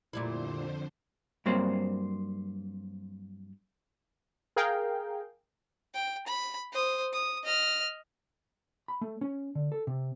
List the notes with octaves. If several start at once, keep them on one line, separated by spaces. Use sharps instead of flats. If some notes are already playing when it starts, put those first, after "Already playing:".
F2 A#2 D3 G3 E4 C5
G2 F#3 A#3 C4 C5
G#4 A#4 F5 G5
G5
B5
C5 D#6
D#6
D#5 F6
B5
A3
C#4
D3
A4
C3